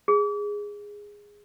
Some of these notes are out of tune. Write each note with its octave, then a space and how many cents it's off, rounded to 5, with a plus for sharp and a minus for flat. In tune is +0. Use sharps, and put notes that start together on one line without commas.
G#4 -10